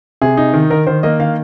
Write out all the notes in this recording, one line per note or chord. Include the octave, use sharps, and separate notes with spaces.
C3 G#4
D#4
D#3
D#3 A#4
D#3 C5
A#3 D#5
D#3 F5